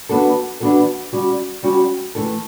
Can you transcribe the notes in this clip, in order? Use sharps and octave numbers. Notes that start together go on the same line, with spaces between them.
E3 B3 D4 F#4 A4
E3 B3 D4 F#4 A4
G3 C#4 F#4
G3 C#4 F#4
E3 A3 E4 A4